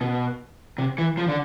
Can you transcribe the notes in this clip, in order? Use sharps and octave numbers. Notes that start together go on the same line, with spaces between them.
B2
C3
E3
F3
D3